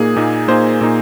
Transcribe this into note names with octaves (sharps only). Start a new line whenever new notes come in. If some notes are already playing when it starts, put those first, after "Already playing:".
Already playing: A#2 A#3 D#4 G#4
A#2 A#3 D#4
A#2 A#3 D#4 C5
A#2 A#3 D#4